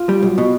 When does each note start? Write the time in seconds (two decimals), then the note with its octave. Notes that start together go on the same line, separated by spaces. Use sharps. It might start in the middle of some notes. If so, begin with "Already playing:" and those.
Already playing: F4
0.09 G3
0.22 B1
0.38 B2